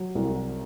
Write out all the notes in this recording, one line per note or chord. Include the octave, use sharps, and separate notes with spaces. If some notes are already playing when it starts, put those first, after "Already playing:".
Already playing: F#3
C2